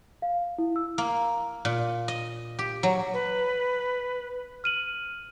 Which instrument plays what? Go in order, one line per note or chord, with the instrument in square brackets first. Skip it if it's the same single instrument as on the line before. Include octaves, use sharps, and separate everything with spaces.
[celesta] F5
E4
E6
[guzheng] A#3
A#2
D#5
G4
F#3
[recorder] B4
[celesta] F6 D#7 F#7